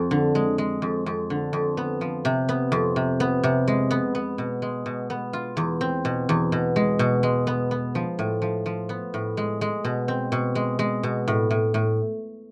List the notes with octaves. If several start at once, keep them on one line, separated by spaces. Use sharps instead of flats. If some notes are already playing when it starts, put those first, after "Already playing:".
Already playing: F2
D3
G#3
G#3
F2
F2
D3
F2
B3
F3
C3
B3
F2
C3
B3
C3
G#3
B3
B3
B2
G#3
B2
B3
F4
E2
C4
B2
E2
B2
G#3
B2
G#3
B3
B3
F3
A2
F3
F3
B3
A2
G#3
G#3
B2
C4
B2
G#3
G#3
B2
A2
A2
A2